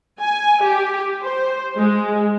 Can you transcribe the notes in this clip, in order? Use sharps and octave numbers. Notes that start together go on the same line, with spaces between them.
G#5
G4
C5
G#3